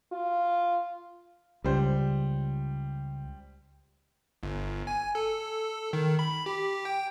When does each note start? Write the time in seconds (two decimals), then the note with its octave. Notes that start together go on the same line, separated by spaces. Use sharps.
0.13 F4
1.64 C#2 G3 C5
4.43 G1
4.87 G#5
5.15 A4
5.93 D#3
6.19 B5
6.46 G4
6.85 G5